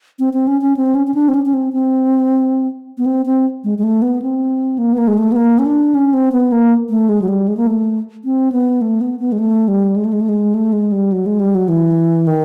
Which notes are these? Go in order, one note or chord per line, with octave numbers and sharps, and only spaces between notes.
C4
C4
C#4
C#4
C4
C#4
C#4
D4
C4
C#4
C#4
C4
C4
B3
C4
C4
G#3
G#3
A3
B3
C4
A#3
B3
A#3
G#3
A3
B3
A#3
C#4
D4
C#4
C4
B3
A#3
A3
G#3
F#3
G3
G#3
A#3
A3
C4
B3
A3
B3
B3
G#3
A3
G3
G#3
A3
G#3
A3
G#3
A3
G#3
G3
F#3
G#3
G3
F#3
E3
D#3